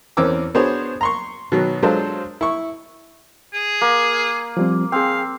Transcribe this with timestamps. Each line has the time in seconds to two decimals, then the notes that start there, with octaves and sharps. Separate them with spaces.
0.17 E2 C4 C#4 A#4 D6 E6
0.55 B3 D4 F#4 G#4 C5 C#5
1.01 A#5 C6 C#6
1.52 B2 D#3 F#3
1.83 F#3 G#3 D4 F4 A4 C5
2.41 E4 C#6
3.54 G#4
3.81 A#3
4.57 F3 G3 C4
4.92 C4 G#4 F5 G5